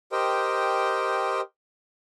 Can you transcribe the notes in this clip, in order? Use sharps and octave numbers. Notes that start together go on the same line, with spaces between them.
G4 A#4 C5 D#5 G5